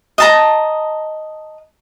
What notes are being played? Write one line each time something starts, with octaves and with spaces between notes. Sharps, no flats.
D#5 A5 A#5